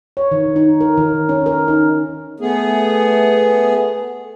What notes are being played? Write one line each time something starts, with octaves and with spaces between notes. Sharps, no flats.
C#5
D#3
D#4
A#4
D#3
C#4
A#4
D#4
A3 B3 G#4